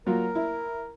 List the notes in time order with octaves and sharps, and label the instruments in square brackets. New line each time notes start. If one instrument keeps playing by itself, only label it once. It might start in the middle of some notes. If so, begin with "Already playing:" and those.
[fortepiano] F#3 A#3 F4 [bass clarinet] A#4
[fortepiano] E4